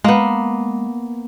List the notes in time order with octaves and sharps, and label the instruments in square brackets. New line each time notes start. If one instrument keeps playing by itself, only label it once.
[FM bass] G#3 [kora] A#3 B3